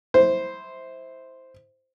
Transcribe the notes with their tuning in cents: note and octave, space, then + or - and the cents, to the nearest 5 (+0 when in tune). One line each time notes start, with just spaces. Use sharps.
E4 -20 C5 +0